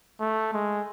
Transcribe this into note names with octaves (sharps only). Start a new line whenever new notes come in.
A3
G#3